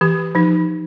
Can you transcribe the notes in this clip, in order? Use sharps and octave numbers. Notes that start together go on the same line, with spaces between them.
E3 G4
F3 D#4